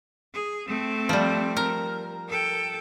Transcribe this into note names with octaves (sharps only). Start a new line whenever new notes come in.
G#4
A3 C4
F3 G3
A#4
A4 G5